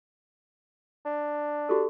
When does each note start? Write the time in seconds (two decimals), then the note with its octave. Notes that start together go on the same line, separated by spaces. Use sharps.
1.05 D4
1.69 F#4 G4 A4